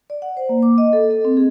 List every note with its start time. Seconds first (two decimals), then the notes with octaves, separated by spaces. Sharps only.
0.10 D5
0.22 F#5
0.37 C5
0.49 A#3
0.63 D6
0.78 D#5
0.93 A4
1.11 A4
1.25 C4
1.37 G#4